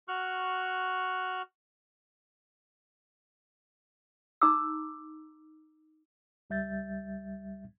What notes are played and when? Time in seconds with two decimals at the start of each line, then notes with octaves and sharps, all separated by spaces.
0.08 F#4 C#6 F6 F#6
4.41 D#4 A#5 D6 E6
6.50 C#2 G3 E5 G6 A6